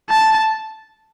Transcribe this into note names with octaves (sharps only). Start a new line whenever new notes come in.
A5